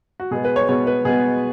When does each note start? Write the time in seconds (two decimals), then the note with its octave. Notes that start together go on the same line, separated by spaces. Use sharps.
0.20 F#4
0.31 B2 G#3 B3 G#4
0.44 B4
0.56 C#5
0.69 B2 G#3 B3 C#5
0.87 B4
1.05 B2 G#3 B3 G#4